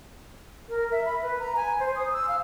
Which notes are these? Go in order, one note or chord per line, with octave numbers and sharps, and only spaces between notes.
A#4
E5
B5
B4
A#5
G#5
C5
D#6
E6
F5